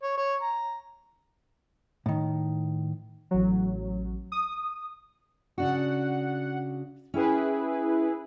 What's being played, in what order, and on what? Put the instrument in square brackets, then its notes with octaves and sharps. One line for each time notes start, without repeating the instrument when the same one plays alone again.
[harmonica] C#5
C#5
A#5
[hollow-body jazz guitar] A2 D#3
[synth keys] A1 F#3
D#6
[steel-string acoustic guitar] C#3 D4 F#4 [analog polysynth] F#5
[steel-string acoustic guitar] C#4 G5 G#5 [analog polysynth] E4 G#4 B4